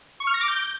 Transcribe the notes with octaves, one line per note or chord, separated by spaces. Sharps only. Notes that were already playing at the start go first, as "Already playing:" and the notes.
C#6
F6
A#6
D6
G6